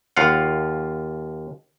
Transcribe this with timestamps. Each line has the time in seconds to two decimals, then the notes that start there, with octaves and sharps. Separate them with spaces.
0.17 D#2 F4 F5 F#5